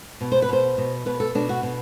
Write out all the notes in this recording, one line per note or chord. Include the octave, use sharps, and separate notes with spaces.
B2
C5
B4
B2 C5
B2
B2 B4
A4
B2 D4
F#4
B2